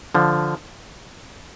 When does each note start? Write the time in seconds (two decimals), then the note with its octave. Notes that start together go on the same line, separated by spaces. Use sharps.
0.15 D3 F3